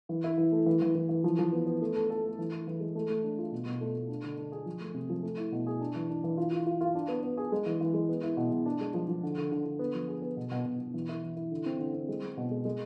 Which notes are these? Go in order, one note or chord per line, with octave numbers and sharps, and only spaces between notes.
E3
E4
E3
A3
E3
E3
E3
E3
F3
F3
B3
B3
A3
A4
A4
A3
E3
E4
E3
G#3
A3
A3
D4
F4
B2
B2
A3
A3
D4
D3
D4
G#4
F3
A3
C3
F3
A3
E4
B2
G#4
D4
E3
D4
E3
F4
F4
F4
F4
D4
B3
B3
G#4
G#3
E3
E3
G#3
B3
E4
B2
B2
D4
G#3
F3
F3
D3
D3
D3
D3
B3
F3
G#4
B3
B2
B2
B2
B2
E3
E4
E3
E4
D3
C4
D3
C4
G#3
G#3
B2
G#3
G#3